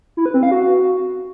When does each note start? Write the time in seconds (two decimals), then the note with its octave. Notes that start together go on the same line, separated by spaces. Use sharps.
0.17 E4
0.26 B4
0.34 C4
0.43 F5
0.51 F#4